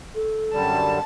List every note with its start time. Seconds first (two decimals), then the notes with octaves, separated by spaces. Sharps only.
0.15 A4
0.53 F#2 D3 G3 A5